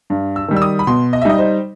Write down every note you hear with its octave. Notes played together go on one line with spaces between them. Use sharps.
G2
E6
D#3 G3
E6
D#6
B5
B2 C6
D#5
E5
G3 D#4 D#5
C5